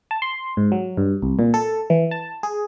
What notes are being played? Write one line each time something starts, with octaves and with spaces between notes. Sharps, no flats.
A5
C6
G#2
F#3
G2
C2
A#2
A4
E3
A5
G#4